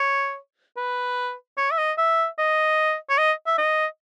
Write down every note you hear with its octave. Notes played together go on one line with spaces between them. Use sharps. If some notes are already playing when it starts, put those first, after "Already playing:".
Already playing: C#5
B4
C#5
E5
D#5
E5
D#5
C#5
D#5
E5
D#5